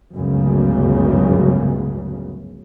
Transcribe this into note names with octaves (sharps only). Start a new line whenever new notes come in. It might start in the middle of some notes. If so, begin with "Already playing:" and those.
G1 C#2 F#2 A2 C#3